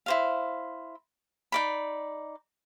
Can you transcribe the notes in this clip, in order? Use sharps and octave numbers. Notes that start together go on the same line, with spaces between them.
E4 C5 F5
D#4 D5 B5